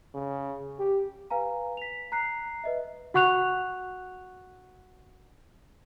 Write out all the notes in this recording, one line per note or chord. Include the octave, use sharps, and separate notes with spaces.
C#3
G4
B4 F5 G#5 A#5
B6 F7
A#5 F#6 C7
B4 D#5 E5
F#4 F#5 C#6 F#6 F7